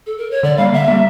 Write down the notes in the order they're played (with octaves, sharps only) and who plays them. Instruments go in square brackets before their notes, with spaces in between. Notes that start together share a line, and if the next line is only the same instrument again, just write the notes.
[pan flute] A4
A#4
C#5
[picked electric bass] D3 [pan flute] D5
[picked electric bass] G3 A#3 [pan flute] F5
[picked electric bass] D3 [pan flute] E5
[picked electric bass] G3 A#3